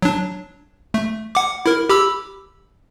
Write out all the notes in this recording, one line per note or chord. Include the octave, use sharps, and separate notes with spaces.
F#3 D4
A3
F#5 D6
E4 A#4
G4 B5 E6